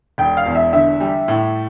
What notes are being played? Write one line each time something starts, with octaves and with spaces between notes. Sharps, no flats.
E1 G5
F5
E2
E5
D3 E5
G3
A2